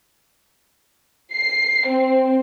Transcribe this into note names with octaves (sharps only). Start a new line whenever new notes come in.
C7
C4